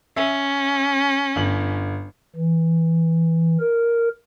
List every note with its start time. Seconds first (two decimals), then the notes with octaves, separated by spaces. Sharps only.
0.16 C#4 E5
1.36 G1 F#7
2.36 E3
3.60 A#4